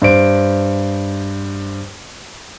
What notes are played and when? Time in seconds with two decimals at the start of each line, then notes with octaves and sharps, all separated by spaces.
0.02 G2 C5 D7